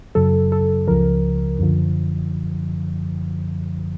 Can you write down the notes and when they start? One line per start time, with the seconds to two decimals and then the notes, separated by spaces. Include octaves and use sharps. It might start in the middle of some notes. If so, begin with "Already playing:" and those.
0.15 F#2 C#3 F#3 A4
0.52 A4
0.88 C#2 C#3 F3 A#4
1.59 F#2 D3 F3